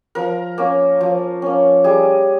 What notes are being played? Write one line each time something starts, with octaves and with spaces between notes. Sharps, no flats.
F3 A#4
A#3 C#4
F3
A#3 C#4
G3 G#4